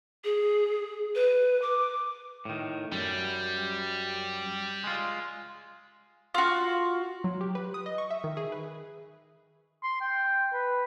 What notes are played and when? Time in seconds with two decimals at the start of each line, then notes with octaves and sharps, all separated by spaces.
0.24 G#4
1.16 B4
1.62 D6
2.45 A2 D#3
2.92 F#2 G3
4.84 G#3 F4
6.34 F4 F#4
7.24 F#3
7.41 G4
7.55 B4
7.74 D#6
7.86 D#5
7.98 C#6
8.11 E5
8.24 D#3
8.37 G#4
8.52 B4
9.83 C6
10.01 G5
10.53 B4